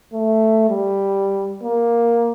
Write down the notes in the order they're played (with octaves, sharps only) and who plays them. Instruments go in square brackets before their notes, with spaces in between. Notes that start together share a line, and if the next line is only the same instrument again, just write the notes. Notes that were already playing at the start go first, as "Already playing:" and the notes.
[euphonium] A3
G3
A#3